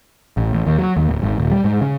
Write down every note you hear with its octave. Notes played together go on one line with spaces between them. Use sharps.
A1
A1
D#2
F#3
D#2
D1
G#1
D#1
G3
G#2
C#3